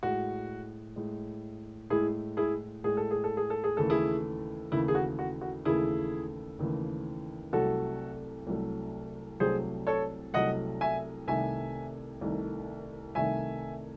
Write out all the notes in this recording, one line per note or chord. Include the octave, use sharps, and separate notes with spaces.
A2 G#3 F#4
A2 G#3
A2 G#3 E4 G#4
E4 G#4
A2 G#3 G#4
A4
G#4
A4
G#4
A4
G#4
D#2 C#3 E3 A3 A4
E4 G#4
D#2 C#3 E3 A3 E4
G#4
F#4
F#4
F#4
D#2 C#3 E3 A3 E4 G#4
D#2 C#3 E3 A3
C2 C3 F#3 A3 F#4 A4
C2 C3 F#3 A3
C2 C3 F#3 A3 G#4 C5
A4 C#5
C2 C3 F#3 A3 D#5 F#5
E5 G#5
C2 C3 D#3 A3 E5 G#5
C2 C3 D#3 A3
C2 C3 D#3 A3 E5 G#5